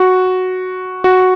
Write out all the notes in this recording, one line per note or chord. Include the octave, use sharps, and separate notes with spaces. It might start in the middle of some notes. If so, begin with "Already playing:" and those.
Already playing: F#4
F#4